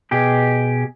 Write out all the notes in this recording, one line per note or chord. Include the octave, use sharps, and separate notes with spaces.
B2 G4 G#4